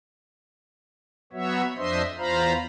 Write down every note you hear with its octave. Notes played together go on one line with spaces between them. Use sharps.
F#3 B3 F#4 C#5 E5
F2 D4 C5 D#5 E5 C6
E2 F4 C5 F5 A#5 B5